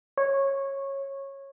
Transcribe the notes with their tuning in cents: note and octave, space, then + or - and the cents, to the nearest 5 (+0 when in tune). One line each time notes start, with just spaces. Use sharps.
C#5 -15